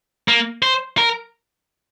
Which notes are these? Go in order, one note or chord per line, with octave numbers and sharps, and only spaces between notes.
A#3
C5
A#4